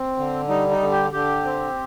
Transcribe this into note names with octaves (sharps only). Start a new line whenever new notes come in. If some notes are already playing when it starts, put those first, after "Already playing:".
Already playing: C4
D3
G3 D#4
D#4
D3
G4
D3 G4
C4